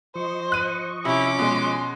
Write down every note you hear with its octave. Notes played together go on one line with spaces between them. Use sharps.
F3 C5 D#5 C#6
F#6 D#7
C3 C#4 E4 D6
B2 G#3 C6